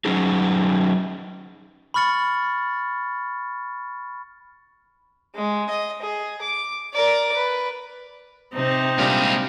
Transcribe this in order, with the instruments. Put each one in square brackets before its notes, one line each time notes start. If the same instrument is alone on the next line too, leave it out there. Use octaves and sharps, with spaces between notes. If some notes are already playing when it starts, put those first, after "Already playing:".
[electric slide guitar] F#3 C#4 D#4 G#4
[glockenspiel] B5 C#6 F6 A6 C#7
[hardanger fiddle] G#3
D#5
G#4
D6
A#4 D5
B4
[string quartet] C3 [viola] C4 D#4
[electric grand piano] A#2 G3 D4 [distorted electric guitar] G#3 F5